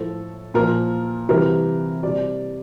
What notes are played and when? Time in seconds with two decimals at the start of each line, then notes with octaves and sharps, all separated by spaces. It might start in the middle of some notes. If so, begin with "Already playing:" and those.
Already playing: A2 F3 A4
0.54 A#2 F3 A#4
1.29 C3 E3 G3 A#4
2.03 C3 G3 D5